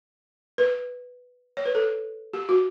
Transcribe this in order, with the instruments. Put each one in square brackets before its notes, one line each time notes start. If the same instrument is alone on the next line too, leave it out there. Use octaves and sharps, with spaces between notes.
[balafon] B4
C#5
B4
A4
G4
F#4